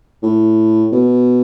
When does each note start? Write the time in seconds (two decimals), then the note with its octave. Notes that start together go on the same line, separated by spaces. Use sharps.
0.23 A2
0.92 B2